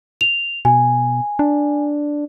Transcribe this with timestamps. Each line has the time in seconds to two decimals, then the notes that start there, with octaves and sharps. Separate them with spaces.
0.21 F7
0.65 B2 G#5
1.39 D4